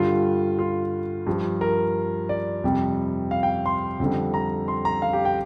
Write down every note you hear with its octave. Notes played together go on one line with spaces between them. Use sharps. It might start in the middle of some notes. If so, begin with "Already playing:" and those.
Already playing: G2 D3 G3 F4
F4
G2 F3
A#4
D5
F2 C3 G3
F5
G5
C6
F2 D3 G3
A#5
C6
A#5
F5
G4
G5